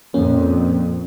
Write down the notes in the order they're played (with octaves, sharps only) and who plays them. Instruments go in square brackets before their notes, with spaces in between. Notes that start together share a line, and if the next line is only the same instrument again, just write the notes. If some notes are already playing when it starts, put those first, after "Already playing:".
[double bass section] F2 A#2 [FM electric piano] A#3 C#4